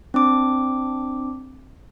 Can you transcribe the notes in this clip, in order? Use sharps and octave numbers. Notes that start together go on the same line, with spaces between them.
C4 D4 D6